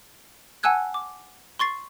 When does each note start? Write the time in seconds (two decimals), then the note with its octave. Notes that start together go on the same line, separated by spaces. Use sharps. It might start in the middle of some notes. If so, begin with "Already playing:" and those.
0.63 F#5 G#5 A5 E6 F#6 G#6
0.94 D6
1.59 C6 C#6 A6 C7